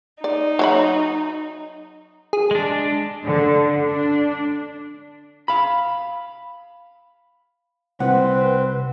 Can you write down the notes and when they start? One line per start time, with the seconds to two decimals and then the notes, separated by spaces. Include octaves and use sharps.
0.24 D#4 D5
0.59 F#3 C#5 B5
2.33 G#4
2.51 G#3 D4
3.24 D3
3.86 D4
5.48 F5 B5
8.00 C2 C4 B4 F#5